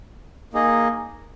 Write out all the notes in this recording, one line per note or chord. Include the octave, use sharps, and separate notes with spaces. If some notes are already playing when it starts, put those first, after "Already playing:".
A#3 D#4 G#4 D#5